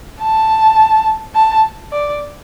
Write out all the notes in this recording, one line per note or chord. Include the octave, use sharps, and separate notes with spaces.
A5
A5
D5